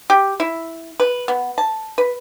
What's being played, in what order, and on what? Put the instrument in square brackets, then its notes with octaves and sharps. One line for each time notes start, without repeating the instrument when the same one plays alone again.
[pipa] G4
E4
B4
B3
A5
B4